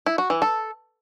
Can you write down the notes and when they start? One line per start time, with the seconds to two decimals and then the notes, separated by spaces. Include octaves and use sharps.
0.06 E4
0.18 F#4
0.30 E3
0.42 A4